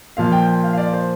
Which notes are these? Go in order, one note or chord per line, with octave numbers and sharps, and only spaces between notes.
A#2 F3 F5
G5
G5
F5
F5
D5
C5